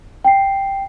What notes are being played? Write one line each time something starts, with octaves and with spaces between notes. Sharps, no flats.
G5 C7